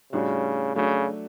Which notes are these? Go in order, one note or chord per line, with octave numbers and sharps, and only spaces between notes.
A2 C#3 G3 D4 F#4
C#3 F#3 A3 D4 F#4